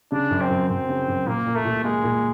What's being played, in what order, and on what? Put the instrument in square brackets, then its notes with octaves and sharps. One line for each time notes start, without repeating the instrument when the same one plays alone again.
[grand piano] C#3 [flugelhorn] D4
[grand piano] F#2
[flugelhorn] C4
[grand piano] F#2
[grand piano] F#2 [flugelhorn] C4
[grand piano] C#3
F#2
[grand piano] A#2 [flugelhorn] A#3
[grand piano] A#2
[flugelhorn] A3
[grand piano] A#2
[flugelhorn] G#3 [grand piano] A#3
[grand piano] A#2